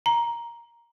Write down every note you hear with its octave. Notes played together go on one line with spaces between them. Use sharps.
A#5